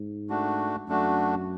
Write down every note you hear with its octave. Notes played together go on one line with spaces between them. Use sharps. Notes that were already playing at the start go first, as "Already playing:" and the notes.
Already playing: G#2
A3 D4 F#4
F#2 A3 D4 F#4